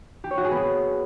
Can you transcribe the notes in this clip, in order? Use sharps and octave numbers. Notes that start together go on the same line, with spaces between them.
G4
C#5
F#4
G#4
B3